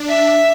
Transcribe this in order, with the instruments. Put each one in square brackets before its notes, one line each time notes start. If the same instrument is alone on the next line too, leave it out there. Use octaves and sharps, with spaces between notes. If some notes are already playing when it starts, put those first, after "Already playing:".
Already playing: [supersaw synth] D4
[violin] E5